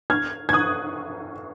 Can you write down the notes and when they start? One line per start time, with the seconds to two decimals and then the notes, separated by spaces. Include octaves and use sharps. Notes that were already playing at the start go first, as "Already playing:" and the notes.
0.10 F6 G#6
0.49 G#6
0.53 D#6 F#6